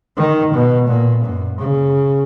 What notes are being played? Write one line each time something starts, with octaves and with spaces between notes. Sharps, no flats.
D#3
B2
A#2
F#2
C#3